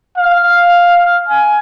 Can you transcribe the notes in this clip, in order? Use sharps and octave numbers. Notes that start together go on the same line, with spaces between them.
F5
G#5